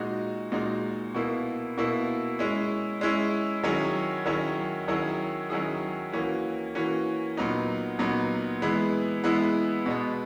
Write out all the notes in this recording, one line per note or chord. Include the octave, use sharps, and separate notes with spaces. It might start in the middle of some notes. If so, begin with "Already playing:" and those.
Already playing: A#2 G#3 D#4 F#4
A#2 G#3 D#4 F#4
B2 A#3 E4
B2 A#3 E4
G#3 C#4 E4
G#3 C#4 E4
D#3 F#3 C#4 E4 G#4
D#3 F#3 C#4 E4 G#4
D#3 F#3 C#4 E4 G#4
D#3 F#3 C#4 E4 G#4
E3 A#3 C#4 F#4
E3 A#3 C#4 F#4
A#2 F#3 B3 D#4
A#2 F#3 B3 D#4
E3 G#3 B3 E4
E3 G#3 B3 E4
B2 G#3 B3